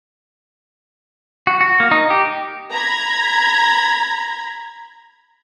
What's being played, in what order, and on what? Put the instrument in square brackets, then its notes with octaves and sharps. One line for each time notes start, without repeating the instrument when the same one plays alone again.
[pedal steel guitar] F#4
F#4
A#3
D#4
G4
[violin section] A#5 B5 G#6